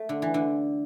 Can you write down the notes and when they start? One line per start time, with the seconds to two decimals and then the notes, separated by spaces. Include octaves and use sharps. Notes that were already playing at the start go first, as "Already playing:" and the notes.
Already playing: A3
0.09 D3
0.22 E3
0.34 D3